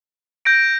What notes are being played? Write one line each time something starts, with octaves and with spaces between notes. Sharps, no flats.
G6 A#6 D7